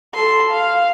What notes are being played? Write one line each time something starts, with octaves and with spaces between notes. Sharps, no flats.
A4 C6
F5